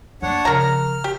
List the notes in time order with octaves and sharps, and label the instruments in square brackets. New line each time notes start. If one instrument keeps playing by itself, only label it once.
[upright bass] A#3 B3 [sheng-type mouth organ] D4 C#5 F#5
[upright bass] C#3 F3 [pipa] A#4 A#5
[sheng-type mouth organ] F6
[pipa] G4